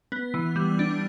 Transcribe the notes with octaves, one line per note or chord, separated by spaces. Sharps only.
B3
E3
G3
D4